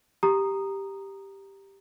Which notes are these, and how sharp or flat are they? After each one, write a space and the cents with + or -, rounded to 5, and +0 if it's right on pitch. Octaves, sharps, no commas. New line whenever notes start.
G4 +0 A#5 +0 D#6 -15